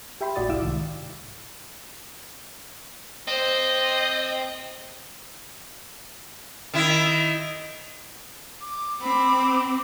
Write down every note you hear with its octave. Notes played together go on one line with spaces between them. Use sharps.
G4 E5 G5 B5 C6
G#1 A2 F#4 D5 D#6 A6
C2 E4 F5 D6 E6 E7
G#2 C3 D#3
C4 C5 D#5
D#3 E4
D6
C4 B5